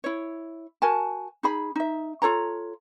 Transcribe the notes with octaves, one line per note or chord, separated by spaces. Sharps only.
E4 C#5
F#4 A#4 G#5 A5
D#4 G#4 B5
D#4 E5
F4 A4 C#5 A#5